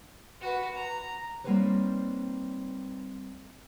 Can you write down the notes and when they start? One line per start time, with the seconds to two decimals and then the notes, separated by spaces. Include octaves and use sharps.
0.41 F#4 B4
0.75 A#5
1.44 G3 A#3 C4 D#4 B4 C#5